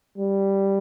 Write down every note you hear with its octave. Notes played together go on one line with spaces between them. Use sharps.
G3